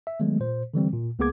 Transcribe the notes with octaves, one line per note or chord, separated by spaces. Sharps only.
E5
D#3 F#3 G#3 A3 B3
A#2 C5
D3 E3 G3 C4
A#2
C#2 A#3 B3 G#4 D6 G#6